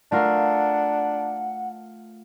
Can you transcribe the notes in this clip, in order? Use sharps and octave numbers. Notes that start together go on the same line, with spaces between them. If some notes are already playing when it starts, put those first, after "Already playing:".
A3 D4 F4 A#4 F#5